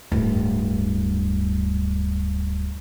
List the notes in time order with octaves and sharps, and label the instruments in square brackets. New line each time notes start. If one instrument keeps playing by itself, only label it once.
[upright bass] D1 G2